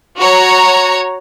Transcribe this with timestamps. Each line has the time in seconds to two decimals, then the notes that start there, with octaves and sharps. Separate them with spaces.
0.19 F#4 C#5 A#5